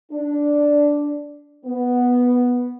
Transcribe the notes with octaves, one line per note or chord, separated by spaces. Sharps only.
D4
B3